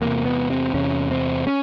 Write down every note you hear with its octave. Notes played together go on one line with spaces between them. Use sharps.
E2 C3 A#3
B3
C4
E2 C3 C#4
C4
C#4